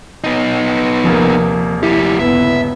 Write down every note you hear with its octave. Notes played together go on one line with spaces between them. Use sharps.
B3 D#4
D#1 C3 F3 A#3
F3 E4 G4
G1 C#2 B3 E5